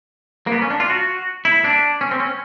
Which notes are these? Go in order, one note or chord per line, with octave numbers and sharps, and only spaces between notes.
A#3
B3
C#4
D4
F4
F#4
E4
D4
C#4
C4
C#4